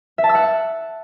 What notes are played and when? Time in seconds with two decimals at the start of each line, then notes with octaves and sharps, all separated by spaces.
0.18 E5
0.24 A5
0.29 E6
0.35 F#5